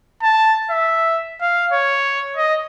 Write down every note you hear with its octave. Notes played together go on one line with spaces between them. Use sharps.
A5
E5
F5
C#5
D#5